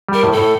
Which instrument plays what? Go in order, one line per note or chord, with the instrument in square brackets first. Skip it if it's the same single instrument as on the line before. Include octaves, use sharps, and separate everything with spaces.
[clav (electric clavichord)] G3 [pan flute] A#4
[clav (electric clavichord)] A2
[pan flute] A4
[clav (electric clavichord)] A2